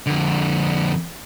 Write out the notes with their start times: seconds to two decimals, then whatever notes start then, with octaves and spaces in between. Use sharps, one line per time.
0.06 F2 D3